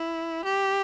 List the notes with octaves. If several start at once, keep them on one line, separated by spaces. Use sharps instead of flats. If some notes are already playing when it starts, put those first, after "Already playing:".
Already playing: E4
G4